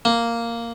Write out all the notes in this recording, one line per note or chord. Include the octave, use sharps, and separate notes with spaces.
A#3